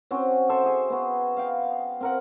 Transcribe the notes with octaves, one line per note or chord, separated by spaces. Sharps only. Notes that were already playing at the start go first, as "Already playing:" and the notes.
C4 C#4 F#4
A4 C5 E5
F#4 G#4
B3 F#4
F5 G5
C4 A#4 F#5